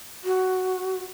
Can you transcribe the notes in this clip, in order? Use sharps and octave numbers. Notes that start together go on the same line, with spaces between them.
F#4